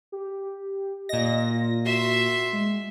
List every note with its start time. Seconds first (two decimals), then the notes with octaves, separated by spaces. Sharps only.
0.12 G4
1.09 A#2 D#5 A#6
1.50 F4
1.85 F#4 E5 C6
2.53 G#3